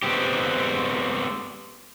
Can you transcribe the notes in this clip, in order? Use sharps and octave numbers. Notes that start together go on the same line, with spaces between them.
G#3 B3 C4 G4